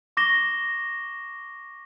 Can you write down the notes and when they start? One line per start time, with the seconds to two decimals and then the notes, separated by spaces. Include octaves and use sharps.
0.17 C#6 D6 A#6 E7 G7